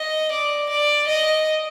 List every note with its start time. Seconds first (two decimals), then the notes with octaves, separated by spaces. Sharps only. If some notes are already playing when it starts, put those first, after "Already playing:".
Already playing: D#5
0.32 D5
0.70 D5
1.08 D#5